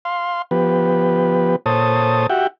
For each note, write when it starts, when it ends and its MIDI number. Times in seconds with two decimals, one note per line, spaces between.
0.05 0.42 77
0.05 0.42 84
0.51 1.56 53
0.51 1.56 59
0.51 1.56 67
0.51 1.56 71
1.66 2.27 46
1.66 2.27 69
1.66 2.27 72
1.66 2.27 73
1.66 2.27 81
1.66 2.27 87
2.30 2.47 66
2.30 2.47 67
2.30 2.47 76
2.30 2.47 78
2.30 2.47 79